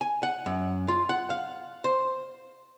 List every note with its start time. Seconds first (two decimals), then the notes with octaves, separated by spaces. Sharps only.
0.01 G#5
0.23 F#5
0.46 F#2
0.88 F4
1.09 F#5
1.30 F5
1.84 C5